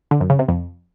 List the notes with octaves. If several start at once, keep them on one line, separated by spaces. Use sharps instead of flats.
D3
F#2
C#3
C3
F2